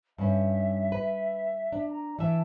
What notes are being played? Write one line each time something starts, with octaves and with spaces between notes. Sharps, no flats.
G2 C#4 E5
B4
D4
A#5
E3 E5 A5